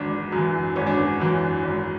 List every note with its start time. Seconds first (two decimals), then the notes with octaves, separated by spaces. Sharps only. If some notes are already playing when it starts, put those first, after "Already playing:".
Already playing: G#1 F#2 E3 D4
0.32 F#2
0.37 E3
0.76 G#1 C#4
0.86 D4
0.97 C#4
1.20 F#2 E3
1.63 G#1